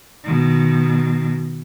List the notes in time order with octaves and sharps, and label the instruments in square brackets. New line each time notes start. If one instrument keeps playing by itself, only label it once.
[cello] B2 D#3